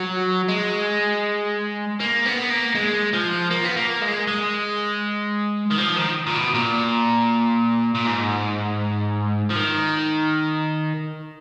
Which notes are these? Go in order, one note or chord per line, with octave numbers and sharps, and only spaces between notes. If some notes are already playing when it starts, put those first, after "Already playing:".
Already playing: F#3
G#3
A#3
B3
A#3
G#3
F3
A#3
B3
A#3
G#3
G#3
D#3
F3
D#3
A#2
B2
A#2
A#2
G#2
F3
D#3